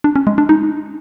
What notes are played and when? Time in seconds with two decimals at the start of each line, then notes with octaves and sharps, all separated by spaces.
0.04 D4
0.16 C#4
0.27 G#3
0.38 D4
0.49 D#4